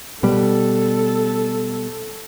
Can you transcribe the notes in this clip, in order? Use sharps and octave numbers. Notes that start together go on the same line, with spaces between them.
B2 G3 A4